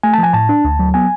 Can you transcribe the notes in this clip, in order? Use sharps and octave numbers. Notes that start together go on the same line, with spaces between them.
A3 G#5
A5
F3 G#5
A2 A5
D4
D2
F#3
B3 G#5